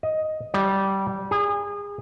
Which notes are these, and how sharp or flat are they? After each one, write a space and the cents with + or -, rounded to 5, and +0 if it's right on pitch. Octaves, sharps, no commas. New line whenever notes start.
D#5 +5
G3 -15
G#4 -30